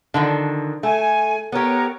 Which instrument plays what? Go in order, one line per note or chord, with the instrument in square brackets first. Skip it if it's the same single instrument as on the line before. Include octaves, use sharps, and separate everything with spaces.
[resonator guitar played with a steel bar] D3 D#3 F3
[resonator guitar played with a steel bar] A3 [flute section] G#5
[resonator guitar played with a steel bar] B3 G4 [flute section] A#4 C#5